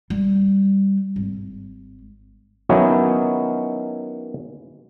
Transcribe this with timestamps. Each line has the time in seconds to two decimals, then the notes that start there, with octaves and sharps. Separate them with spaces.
0.10 G3
1.16 G#1
2.69 D#3 F#3 B3 C#4 D#4 E4